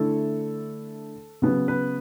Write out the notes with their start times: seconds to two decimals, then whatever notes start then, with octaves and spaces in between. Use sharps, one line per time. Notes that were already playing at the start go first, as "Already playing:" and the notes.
Already playing: D3 A3 E4 A4
1.42 C#3 F#3 B3
1.68 B4